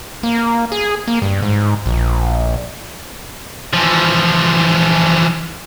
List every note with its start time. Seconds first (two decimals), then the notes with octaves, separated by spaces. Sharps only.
0.23 A#3
0.72 G#4
1.08 A#3
1.22 G2
1.42 G#2
1.86 A#1
3.73 E3 F3